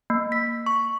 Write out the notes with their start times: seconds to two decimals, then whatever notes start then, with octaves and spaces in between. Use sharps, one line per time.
0.10 A#3
0.32 B6
0.66 C#6